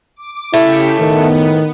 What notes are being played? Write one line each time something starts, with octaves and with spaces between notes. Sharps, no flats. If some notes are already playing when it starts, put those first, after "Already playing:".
D6
C#3 A3 E4 G4
A2 D#3 B3